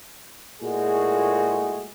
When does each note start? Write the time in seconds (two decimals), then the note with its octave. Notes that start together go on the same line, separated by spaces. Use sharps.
0.61 A#2 G#3 A3 E4 F#4 G#4